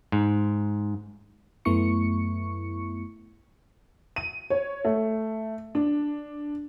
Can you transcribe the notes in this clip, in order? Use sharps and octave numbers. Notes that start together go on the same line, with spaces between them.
G#2
F#2 A3 B3 E4 C#6 C#7
D#7
C#5
A3
D4